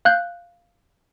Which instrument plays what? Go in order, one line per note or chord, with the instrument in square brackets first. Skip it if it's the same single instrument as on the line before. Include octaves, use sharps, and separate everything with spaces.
[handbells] F5 F#6 G6